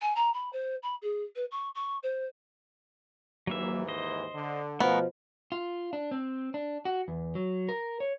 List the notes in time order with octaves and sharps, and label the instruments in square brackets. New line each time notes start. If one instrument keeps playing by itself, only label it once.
[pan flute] G#5
A#5
B5
C5
B5
G#4
B4
C#6
C#6
C5
[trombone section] D#2 G#2 E3 [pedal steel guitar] F#3 A#3 E5
[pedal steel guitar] C5 D#5
[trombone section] D3
[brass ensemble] B2 F3 [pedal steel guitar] A3 F#4 A#4 [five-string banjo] B3
[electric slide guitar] F4
D4
C4
D4
F#4
E2
F#3
A#4
C#5